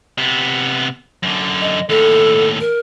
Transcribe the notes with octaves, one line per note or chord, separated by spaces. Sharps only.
C3 B3
F#2 D3
D#5
D#2 A2 A4
A#4